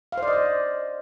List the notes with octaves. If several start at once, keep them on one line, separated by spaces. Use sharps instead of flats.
F5
C5
D5
D#5
D5